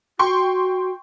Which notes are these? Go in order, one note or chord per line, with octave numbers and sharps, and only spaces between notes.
F#4 G5 C6 C#6